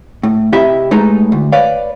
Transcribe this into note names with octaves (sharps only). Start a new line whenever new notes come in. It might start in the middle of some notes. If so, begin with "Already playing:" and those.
A2
C3 E4 G4 D#5 E5 B5
A2 G#3 D#4 A4 B4 A#5
D2
B4 C#5 D5 F5